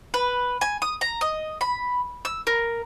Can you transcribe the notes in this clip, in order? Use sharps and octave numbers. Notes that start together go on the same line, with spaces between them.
B4
G#5
D#6
A#5
D#5
B5
E6
A#4